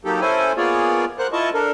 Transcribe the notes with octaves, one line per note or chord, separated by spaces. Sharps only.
F#3 A#3 D#4 G4 A4
C#4 E4 A4 C5 G#5
A#3 B3 F4 G#4 C#5 D5
A#4 C5 F#5 F#6
E4 F4 D#5 A5 C#6
D4 A4 A#4